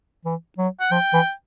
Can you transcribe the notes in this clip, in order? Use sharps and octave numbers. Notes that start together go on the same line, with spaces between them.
E3
F#3
F#5
F3 G5
E3